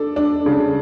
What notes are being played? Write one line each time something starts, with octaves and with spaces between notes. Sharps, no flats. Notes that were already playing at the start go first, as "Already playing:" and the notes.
Already playing: D4 A4
D4
C#3